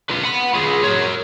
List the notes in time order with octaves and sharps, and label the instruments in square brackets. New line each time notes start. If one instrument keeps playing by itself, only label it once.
[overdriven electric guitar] F4 B4
F#5 B5
F4 G#4
A#4 C#5